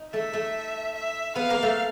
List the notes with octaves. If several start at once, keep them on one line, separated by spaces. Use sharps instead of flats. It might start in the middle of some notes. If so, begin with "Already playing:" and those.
Already playing: D#4
A3 A4 E5
A3 A4
E5
B3 B4 F5
A#3 A#4
A3 A4